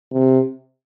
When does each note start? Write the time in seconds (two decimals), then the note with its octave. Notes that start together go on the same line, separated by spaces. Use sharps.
0.12 C3